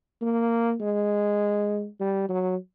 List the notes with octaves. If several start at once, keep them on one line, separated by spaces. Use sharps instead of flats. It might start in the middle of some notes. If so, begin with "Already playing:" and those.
A#3
G#3
G3
F#3